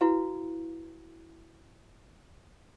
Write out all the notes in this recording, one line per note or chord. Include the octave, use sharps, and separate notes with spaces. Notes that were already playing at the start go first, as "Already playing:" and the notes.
E4 F#4 B4 F5